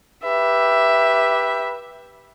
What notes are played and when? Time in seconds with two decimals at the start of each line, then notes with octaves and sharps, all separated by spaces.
0.24 G4 B4 E5